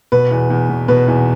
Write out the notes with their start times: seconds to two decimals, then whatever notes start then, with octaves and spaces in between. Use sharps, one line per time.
0.12 B2 B4
0.31 E2
0.50 E2
0.69 B2
0.88 B2 B4
1.08 E2